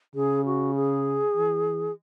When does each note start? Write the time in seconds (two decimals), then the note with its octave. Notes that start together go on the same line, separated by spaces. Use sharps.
0.15 C#3 G#4
0.45 F#4
0.75 G#4
1.36 E3